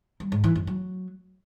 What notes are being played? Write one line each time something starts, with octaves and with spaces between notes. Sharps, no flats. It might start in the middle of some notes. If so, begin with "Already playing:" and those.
G3
G#2
E3
F#2
F#3